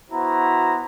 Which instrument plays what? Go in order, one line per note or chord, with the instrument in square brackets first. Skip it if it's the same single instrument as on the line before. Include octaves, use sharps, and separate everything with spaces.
[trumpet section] B3 E4 F#4 C5 A#5